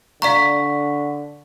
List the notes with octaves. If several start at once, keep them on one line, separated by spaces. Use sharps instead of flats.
D3 D5 F5 A#5 C#6 B6